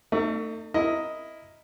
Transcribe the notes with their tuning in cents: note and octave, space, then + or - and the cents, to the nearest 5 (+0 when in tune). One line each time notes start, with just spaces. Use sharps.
A3 +35 D#4 -30 E5 +0
E4 +0 A#4 +0 D#5 +5